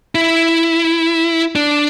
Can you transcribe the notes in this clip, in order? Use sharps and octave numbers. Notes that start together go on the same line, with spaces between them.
E4
D4